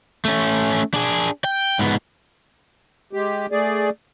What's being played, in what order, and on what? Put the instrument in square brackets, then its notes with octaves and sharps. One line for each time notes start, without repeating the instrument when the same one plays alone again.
[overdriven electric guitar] A3 C#4
D4 G#4
G5
G#2 B3
[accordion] G#3 G4
A3 G#4 D5